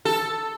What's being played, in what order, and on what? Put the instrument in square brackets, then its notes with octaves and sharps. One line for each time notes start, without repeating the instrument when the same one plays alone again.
[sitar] A4